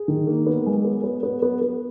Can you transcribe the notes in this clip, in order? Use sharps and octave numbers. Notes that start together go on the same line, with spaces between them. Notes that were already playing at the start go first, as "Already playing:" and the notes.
Already playing: G#4
D#3
A#3
B3
G#3
B3
B3
B3
B3
B3